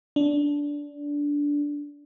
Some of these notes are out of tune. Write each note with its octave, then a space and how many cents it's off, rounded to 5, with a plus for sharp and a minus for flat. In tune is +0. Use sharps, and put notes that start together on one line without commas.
D4 -15